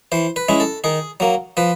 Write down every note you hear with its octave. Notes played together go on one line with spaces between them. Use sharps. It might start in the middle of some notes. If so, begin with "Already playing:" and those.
E3 C5
B4
G#3 C#4 E4
A4
D#3 G#4
F#3 A#3
F3 B4